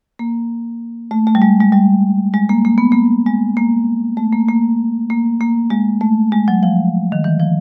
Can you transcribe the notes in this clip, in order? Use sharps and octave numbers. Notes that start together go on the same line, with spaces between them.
A#3
A3
A3
G3
G#3
G#3
G3
G#3
A#3
A#3
B3
A#3
G#3
A#3
A3
A#3
A#3
A#3
A#3
G#3
A3
G#3
F#3
F3
D#3
E3
F3